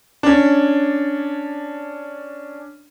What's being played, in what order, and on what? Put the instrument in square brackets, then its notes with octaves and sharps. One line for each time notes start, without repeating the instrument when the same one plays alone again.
[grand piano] C#4 D4